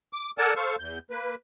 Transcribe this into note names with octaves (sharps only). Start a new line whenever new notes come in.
D6
A4 A#4 D5 F#5 G#5 A5
A4 C5 F5 C#6
E2 G6
A#3 B4